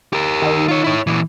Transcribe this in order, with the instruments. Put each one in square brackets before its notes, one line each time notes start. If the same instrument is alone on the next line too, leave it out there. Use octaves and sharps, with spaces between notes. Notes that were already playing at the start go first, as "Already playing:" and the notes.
[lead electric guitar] G4 A#4
[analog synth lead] D#3
[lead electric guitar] F4 C#5
E4 C#5
A#2 E3